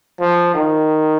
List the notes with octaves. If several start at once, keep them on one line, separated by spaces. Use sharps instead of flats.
F3
D#3